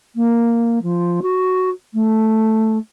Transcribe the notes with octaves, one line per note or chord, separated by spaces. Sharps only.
A#3
F3
F#4
A3